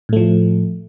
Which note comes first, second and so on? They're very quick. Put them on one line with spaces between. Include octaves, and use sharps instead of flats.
A2 A3 F3